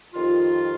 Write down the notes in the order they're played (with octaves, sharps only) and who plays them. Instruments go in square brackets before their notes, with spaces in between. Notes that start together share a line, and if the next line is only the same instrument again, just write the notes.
[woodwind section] F2 D#3 G3 F4